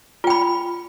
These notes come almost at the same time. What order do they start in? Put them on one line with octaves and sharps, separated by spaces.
F4 G5 B5